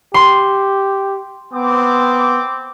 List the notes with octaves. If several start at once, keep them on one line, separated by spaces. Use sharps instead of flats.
G4 C6
B3 C4 D6